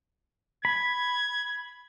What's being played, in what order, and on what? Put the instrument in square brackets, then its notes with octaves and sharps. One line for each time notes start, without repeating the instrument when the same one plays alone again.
[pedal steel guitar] B5 [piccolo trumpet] G#6